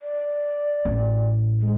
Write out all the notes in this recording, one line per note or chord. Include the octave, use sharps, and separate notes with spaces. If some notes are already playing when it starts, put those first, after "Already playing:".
D5
A1
G#3